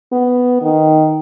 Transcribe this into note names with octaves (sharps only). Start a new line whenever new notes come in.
B3
D#3